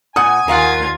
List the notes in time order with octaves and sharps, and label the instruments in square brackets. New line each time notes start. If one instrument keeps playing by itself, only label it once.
[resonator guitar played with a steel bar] A#2 F#5 [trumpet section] G#5 [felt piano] D#6
[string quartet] D#2 F4 G#6 [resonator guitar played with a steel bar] A#4 F5 F#5